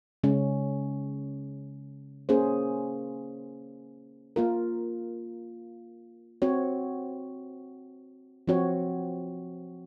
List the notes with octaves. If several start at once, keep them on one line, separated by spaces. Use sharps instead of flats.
C#3 G#3 C#4
A#3 C#4 G#4 C5
A#3 F4 A#4
C4 F#4 C#5
F3 C4 F#4 C#5